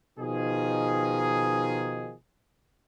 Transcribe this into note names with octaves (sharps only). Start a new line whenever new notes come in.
B2 D#3 F3 D#4 G#4